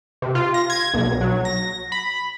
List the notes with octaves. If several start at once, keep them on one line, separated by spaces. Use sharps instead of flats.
C3
F4
A#6
G#6
B1
F#3
A#6
B5